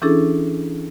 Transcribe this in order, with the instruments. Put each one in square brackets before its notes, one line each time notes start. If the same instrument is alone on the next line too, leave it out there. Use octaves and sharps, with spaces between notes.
[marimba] E3 C#4 D4 E4 G#4 A4